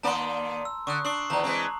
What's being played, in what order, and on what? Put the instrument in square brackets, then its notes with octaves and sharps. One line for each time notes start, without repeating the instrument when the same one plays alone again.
[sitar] D#3 A#3 D5 [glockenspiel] A5 A#5 C6
[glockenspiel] E6
[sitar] D3 [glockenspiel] C#6 D#6 F#6
[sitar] D4 [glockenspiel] C#6 C7 F#7
[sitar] E2 D#3 [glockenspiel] A5 A#5
[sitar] E3 G#3 C4